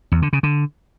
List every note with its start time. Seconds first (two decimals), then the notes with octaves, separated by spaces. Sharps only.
0.12 E2
0.22 D3
0.33 C#3
0.43 D3